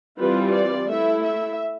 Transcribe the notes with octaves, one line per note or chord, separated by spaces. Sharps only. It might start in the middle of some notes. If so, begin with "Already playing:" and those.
E3 G3 C4 F4 B4
D5
A3 E4 E5
E5